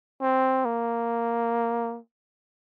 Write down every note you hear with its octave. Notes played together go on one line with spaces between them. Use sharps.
C4
A#3